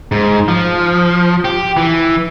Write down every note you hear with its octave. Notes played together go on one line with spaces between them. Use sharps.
G#2
F3
G4
E3